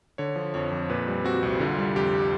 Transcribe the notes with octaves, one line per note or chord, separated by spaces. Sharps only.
D3 C#5
F3
F2 C#5
F2
A#2 B4
G3
C4 F#4
C2
D3 F4
G3
F2 G4